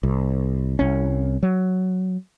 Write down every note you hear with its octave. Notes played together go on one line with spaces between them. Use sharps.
C2
C2 C#4
F#3